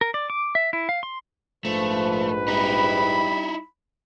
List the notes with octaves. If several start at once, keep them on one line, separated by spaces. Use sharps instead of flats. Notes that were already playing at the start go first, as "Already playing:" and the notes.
A#4
D5
D6
E5
E4
F5
C6
A#1 G#2 F3 A3 B4
G3 D#4 E4 B5